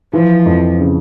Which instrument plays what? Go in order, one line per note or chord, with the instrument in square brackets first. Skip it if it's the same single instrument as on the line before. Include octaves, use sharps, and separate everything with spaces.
[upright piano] E3 [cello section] F3
[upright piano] F2
C#3